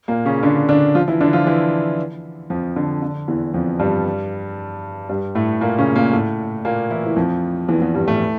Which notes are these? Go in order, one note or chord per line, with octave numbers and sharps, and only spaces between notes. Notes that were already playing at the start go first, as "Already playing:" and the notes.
A#2 A#3
C#3 C#4
D3 D4
D3 D4
F3 F4
E3 E4
D3 D4
F3 F4
E3 E4
F2 F3
D3
D3
E2 E3
F2 F3
G2 G3
G2 G3
A2 A3
A#2 A#3
C#3 C#4
A#2 A#3
A2 A3
A#2 A#3
E3 E4
E3
F2 F3
E2 E3
E2 E3
G2 G3
A2 A3